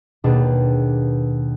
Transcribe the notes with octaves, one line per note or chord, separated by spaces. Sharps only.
D#2 B2 D4 G#4 A5 D6